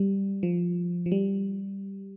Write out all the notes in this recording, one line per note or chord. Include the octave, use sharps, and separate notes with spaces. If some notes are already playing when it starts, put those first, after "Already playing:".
Already playing: G3
F3
F3
G3